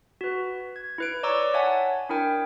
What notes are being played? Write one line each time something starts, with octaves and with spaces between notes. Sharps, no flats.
F#4 B4
G#6
E4 B4 D7
C#5 D5 A#5 C#6 D6 E6
C#5 E5 F#5 G#5 A5
D4 E4 A#4 G5